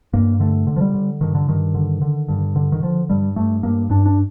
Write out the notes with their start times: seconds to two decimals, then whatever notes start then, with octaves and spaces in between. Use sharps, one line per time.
0.13 G2 A#3
0.40 D3 A3
0.67 D3
0.76 F3
0.81 G3
0.94 D3
1.21 G2 D#3
1.35 D3
1.48 G2 D#3
1.75 D3
2.01 D3
2.28 G2
2.56 D3
2.72 D#3
2.82 D3 F3
3.09 G2 G3
3.36 G2 A3
3.63 G2 A#3
3.90 G2 D4
4.06 D4